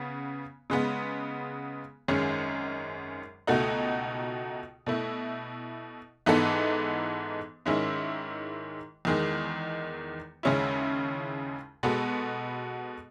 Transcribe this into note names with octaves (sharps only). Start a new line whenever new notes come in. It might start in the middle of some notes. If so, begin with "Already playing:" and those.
Already playing: C#3 B3
C#3 G#3 B3
G#1 F#2 D#3 G#3 C#4
C#2 B2 A3 D#4 F#4
B2 A3 E4
G#2 E3 B3 D#4 A4
G#2 D#3 G#3 C#4 E4
E2 D#3 G#3
D#2 C#3 G#3 C#4 E4
B2 G#3 B3 F#4 A4